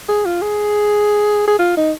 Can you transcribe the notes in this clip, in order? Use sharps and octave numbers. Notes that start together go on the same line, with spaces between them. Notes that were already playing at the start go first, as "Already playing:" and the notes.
G#4
F4
G#4
G#4
F4
D#4